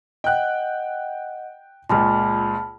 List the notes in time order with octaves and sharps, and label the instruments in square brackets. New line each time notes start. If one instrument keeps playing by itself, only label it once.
[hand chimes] D#5 F#5 [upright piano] G5 F#6
[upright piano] C#2 A#2 [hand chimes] A5 B5 F6